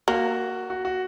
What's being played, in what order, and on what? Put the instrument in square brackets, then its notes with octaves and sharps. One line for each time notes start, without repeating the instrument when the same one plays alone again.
[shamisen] A#3 [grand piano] F#4
[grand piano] F#4
F#4